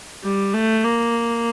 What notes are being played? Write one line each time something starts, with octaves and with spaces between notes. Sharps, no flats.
G3
A3
A#3